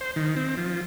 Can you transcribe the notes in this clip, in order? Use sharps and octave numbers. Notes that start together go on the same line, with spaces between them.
C5
D#3
C4
F3